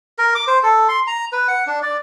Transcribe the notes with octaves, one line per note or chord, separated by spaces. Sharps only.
A#4
D6
C5
A4
C6
A#5
B4
F#5
D4
D5